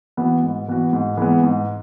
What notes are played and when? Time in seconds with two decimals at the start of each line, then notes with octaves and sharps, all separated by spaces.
0.17 E3 B3 F#4
0.43 G#2
0.68 E3 B3 F#4
0.93 G#2
1.17 E3 G#3 B3
1.43 G#2